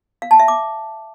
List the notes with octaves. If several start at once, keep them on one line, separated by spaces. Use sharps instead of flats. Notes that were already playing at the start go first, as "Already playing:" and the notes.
F5
A5
E5
D6